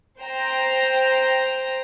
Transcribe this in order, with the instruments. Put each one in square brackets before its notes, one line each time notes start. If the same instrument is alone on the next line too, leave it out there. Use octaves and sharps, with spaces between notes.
[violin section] C5 G5 A#5